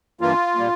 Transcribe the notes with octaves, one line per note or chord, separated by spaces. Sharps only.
G2 E3 A#3 F4
A#2 G3 A#3